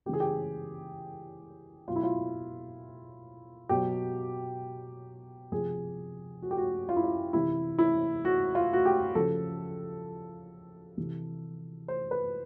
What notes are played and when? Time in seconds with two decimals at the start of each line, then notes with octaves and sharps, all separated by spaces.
0.06 C#3 G4
0.09 E3 G#4
0.20 G4
1.88 B2 F#3 F4
1.96 E4
2.03 F4
3.69 B2 F#3 G4
5.52 C3 F3 G#4
6.42 F#4
6.51 G4
6.58 F#4
6.89 F4
6.96 E4
7.04 F4
7.33 C3 E3 E4
7.79 E4
8.25 F#4
8.55 F4
8.73 F#4
8.86 G4
9.15 C#3 F3 A4
10.97 C3 E3
11.88 C5
12.11 B4